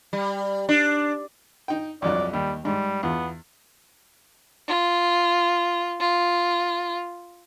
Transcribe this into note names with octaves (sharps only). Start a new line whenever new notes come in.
G3
D4
D#4 G5
C2 F2 F#3 D5
D#2 G3
G#2 G3
E2 B3 F4
F4
F4